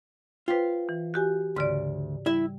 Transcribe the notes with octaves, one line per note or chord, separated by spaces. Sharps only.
F4 B4 C5 G5
E3
F#4 G4 G#5
D2 G#2 C#3 D5
G3 E4 E5